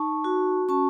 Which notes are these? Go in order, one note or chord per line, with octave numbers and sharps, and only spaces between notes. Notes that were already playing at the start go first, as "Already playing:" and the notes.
Already playing: D#4 A5 C#6
F#4
C#4 A5 C#6